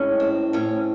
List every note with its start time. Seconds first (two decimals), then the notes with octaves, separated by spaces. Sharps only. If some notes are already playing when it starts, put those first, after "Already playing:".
Already playing: A2 G#3 C#4
0.20 C4
0.53 A2 C#4